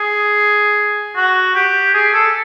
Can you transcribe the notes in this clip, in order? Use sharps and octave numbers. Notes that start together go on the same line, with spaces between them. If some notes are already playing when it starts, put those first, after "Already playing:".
Already playing: G#4
F#4
G4
G#4
A4